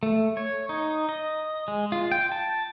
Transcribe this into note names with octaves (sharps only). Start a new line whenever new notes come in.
A3
C#5
D#4
D#5
G#3
F4
G5
A5